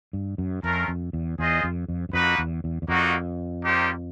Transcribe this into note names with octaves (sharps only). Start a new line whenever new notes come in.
G2
F#2
F2 A3 C#4 F4 A#4
F2
E2
E2 F4 G#4 C5 D#5
F2
F2
F#2
F2 A#3 D#4 F#4 B4
E2
E2
E2
F2 G3 A#3 D#4 F#4
G3 A#3 D#4 G4 C5